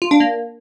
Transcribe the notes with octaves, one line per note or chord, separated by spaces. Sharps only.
F4
D4
A#3